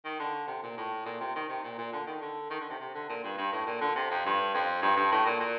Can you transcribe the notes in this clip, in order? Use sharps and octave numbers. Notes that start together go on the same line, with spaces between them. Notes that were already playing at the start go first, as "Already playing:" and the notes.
D#3
D3
C3
A#2
A2
A#2
C3
D#3
C3
A#2
A#2
D3
D#3
D3
D#3
D3
C3
C3
D3
A#2
G2
G2
A2
A#2
D3
C3
F2
G2
F2
G2
G2
A2
A#2
A#2